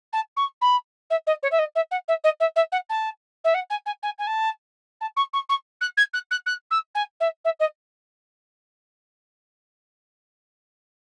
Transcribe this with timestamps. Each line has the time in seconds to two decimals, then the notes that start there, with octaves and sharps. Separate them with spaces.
0.13 A5
0.37 C#6
0.61 B5
1.10 E5
1.27 D#5
1.43 C#5
1.51 E5
1.59 D#5
1.75 E5
1.91 F#5
2.08 E5
2.24 D#5
2.40 E5
2.56 E5
2.72 F#5
2.89 A5
3.44 E5
3.54 F#5
3.70 G#5
3.86 G#5
4.03 G#5
4.18 G#5
4.27 A5
5.01 A5
5.17 C#6
5.33 C#6
5.49 C#6
5.81 F#6
5.97 G#6
6.13 F#6
6.31 F#6
6.46 F#6
6.71 E6
6.95 G#5
7.20 E5
7.45 E5
7.60 D#5